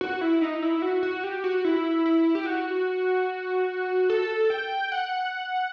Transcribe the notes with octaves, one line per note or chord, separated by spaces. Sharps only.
F#4
E4
D#4
E4
F#4
F#4
G4
F#4
E4
E4
G4
F#4
A4
G5
F#5